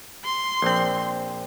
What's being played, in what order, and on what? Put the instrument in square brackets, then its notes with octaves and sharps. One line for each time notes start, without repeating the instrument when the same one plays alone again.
[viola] C6
[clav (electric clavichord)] A#1 C4